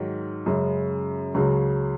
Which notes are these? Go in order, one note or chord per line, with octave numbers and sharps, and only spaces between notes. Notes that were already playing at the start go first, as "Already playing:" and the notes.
Already playing: G#2 D#3 F#3
F#2 C#3 G#3
C#2 C#3 F#3